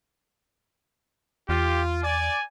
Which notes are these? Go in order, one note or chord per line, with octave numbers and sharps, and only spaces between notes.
E2 F4 G4
D5 G#5